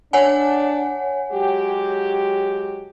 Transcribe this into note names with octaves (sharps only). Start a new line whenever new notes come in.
D4 C#5 F#5 G#5
F#3 G#3 G4